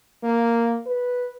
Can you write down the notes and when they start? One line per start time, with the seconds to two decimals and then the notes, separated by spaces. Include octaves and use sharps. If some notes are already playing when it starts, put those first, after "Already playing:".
0.23 A#3
0.86 B4